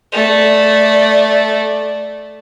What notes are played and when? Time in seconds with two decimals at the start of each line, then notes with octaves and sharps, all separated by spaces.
0.12 A3 D5